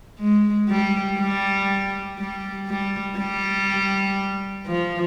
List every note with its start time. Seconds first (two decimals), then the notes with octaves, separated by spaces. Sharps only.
0.19 G#3
0.69 G3
1.19 G3
2.18 G3
2.68 G3
3.18 G3
4.67 F3